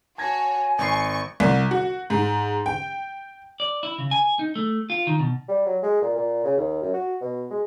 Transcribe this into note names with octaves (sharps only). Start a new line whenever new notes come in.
F#4 C#5 G#5 A5 G#6 A#6
G#1 C#6 C7
C2
F#4
G#2
G5
D5
E4
C#3
G#5
D#4
A3
F4
D#3
B2
G3
F#3
G#3
A#2
A#2
C#3
D#2
F#2
F#4
B2
G#3